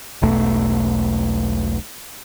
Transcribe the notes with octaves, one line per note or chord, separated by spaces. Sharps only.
E1 B1 A3